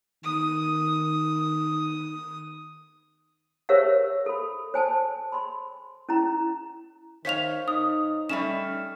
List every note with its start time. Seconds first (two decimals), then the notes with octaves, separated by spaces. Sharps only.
0.24 D#3 D#6
3.69 G4 A#4 C5 C#5 E5 F5
4.26 A4 B5
4.74 C5 G#5 A5
5.32 B5 C6
6.09 C#4 E4 A#5
7.25 D#3 C5 C#5 F5 B6 F7
7.68 D#4 D#6
8.29 G3 A3 C#4 E7